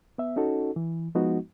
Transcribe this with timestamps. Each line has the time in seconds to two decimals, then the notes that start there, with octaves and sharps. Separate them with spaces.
0.18 B3 E5
0.36 C#4 D#4 F#4 A4
0.76 E3
1.15 F3 G#3 B3 D#4 F#4